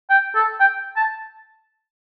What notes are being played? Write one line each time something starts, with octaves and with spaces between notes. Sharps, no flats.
G5
A4
G5
A5